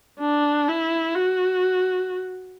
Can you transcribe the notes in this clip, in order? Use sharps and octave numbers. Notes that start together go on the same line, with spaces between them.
D4
E4
F#4